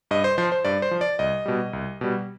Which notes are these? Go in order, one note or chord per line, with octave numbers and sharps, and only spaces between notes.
G2 D#5
C5
F3 C5
C5
G2 D5
C5
F3
D5
C2 D#5
B2 G3
C2
B2 G3